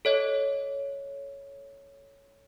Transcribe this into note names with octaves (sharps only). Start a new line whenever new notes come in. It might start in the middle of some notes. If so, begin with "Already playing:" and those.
A4 C#5 D#5